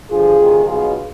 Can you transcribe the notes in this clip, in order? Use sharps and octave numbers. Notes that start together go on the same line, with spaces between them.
G1 G2 D3 F3 F4 G#4
D2 C3 D#3
B1 B2 F4 G#4